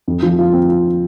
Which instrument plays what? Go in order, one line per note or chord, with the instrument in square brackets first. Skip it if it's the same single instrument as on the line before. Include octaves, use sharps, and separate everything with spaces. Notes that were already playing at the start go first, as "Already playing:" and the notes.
[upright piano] F2
F3
F4
C4
F4